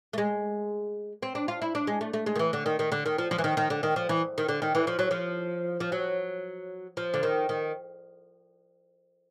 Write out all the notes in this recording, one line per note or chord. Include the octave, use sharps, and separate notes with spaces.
A3
G#3
C4
D4
F4
E4
D4
G#3
A3
A3
G#3
D#3
E3
D3
D#3
D#3
D3
D#3
F3
F3
E3
D#3
D#3
D3
D#3
F3
E3
D#3
D3
D#3
E3
F3
F#3
F3
F3
F#3
F3
D3
D#3
D#3